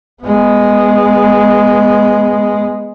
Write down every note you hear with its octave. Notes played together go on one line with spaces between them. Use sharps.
G#3 B3